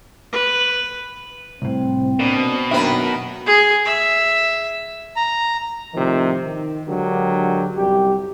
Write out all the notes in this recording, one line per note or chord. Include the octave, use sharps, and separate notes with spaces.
B4
C2 A2 C4
B2 A#3 D4
F#2 D#3 A#3 D4 B4 E5
G#4
E5
A#5
A2 C3 D#3 F3
D#3
D3 F#3 G#3 D4 G4 A#4
C2 F#2 G3 G4